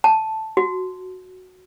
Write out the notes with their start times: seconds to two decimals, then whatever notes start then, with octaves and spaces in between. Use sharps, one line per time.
0.04 A5
0.57 F#4